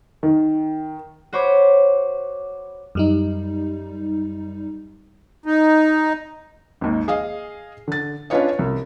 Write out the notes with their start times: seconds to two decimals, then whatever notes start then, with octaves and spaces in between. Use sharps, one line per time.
0.23 D#3
1.33 F#4 C5 C#5 B5 D6
2.95 F#2 G3 D#4
5.46 D#4
6.81 G#1 D#2
7.08 G#4 D#5 F5
7.88 D3 A6
8.30 C#4 D4 F4 B4 C#5 D#5
8.59 C2